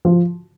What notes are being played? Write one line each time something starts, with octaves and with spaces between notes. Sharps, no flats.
F3